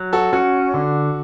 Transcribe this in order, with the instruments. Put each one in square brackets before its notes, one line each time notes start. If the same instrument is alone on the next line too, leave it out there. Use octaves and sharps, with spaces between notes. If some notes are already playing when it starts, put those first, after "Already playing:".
Already playing: [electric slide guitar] F#3
[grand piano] F#4 A4
[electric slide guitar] C#4 [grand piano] F#4
[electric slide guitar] D3